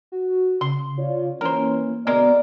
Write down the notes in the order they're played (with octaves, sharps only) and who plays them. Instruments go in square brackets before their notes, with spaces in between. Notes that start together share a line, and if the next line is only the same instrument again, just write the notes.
[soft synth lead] F#4
[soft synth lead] C#3 [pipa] C6
[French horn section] F4 C#5 D5
[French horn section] E3 C#4 C#5 [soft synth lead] A#3 [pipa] A#4 C5
[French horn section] B2 D3 [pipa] G#3 A#4 [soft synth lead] B3 [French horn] D5